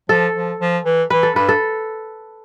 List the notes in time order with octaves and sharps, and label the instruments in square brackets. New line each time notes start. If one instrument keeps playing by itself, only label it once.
[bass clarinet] F3 [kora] A4
[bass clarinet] F3
F3
E3
[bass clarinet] E3 [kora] B4
[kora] A4
[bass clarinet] G2 [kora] B4
[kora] A4